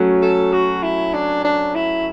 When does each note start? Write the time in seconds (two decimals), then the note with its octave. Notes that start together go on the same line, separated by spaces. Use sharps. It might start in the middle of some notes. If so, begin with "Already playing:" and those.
Already playing: F#3 A3 C#4
0.22 A4
0.53 F#4
0.83 E4
1.14 D4
1.45 D4
1.75 E4